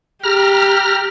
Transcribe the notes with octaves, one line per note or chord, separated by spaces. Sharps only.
G4 A#5 F6